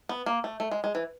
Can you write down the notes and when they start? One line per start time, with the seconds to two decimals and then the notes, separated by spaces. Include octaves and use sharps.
0.09 B3
0.26 A#3
0.44 A3
0.60 A3
0.71 G#3
0.84 G#3
0.95 E3